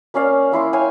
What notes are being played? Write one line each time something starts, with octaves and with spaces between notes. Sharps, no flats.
A#3 C#4 D5 F5
A#3 E4 C6 D6
C#5 F5 G5 G#5